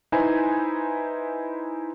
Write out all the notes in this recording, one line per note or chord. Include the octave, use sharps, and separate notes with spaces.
D#4 E4 B4 C5 G#5